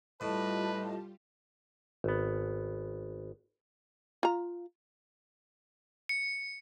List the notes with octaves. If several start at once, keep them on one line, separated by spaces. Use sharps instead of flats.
A2 G3 F4 G4 B4 D#5 A5
G#1 B3
F4 A#5
C#7